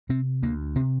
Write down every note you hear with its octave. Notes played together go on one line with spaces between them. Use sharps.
C3 C4
D2 A#3
C3 C4